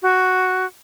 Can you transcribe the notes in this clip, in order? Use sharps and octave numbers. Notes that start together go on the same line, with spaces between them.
F#4